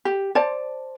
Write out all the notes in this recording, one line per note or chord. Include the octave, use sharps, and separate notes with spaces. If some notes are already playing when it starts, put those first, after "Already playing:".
G4
C5 D5 A5